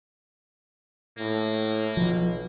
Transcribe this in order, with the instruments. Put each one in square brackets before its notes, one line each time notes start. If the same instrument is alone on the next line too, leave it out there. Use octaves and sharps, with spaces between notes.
[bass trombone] A2 [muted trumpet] A#3
[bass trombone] B1 [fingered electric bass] F3